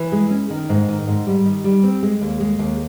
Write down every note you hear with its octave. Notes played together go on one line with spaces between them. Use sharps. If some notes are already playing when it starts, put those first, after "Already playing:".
Already playing: E3
G#3
C#4
D#3
G#2
D#3
G#2
G3
D#3
G3
C4
G#3
D#2
G#3
D#2